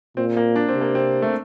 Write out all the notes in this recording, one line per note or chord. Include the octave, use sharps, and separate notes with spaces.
A#2 C4
A#3
D4
C4
C3
A#3
C4
A3